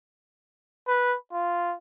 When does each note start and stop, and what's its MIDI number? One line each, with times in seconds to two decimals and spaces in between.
0.88 1.16 71
1.32 1.75 65